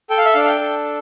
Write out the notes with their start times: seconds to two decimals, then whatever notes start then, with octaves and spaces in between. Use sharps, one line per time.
0.10 A4 G5
0.18 F5
0.25 E5
0.33 D4 F5
0.44 F5
0.48 G5
0.61 A4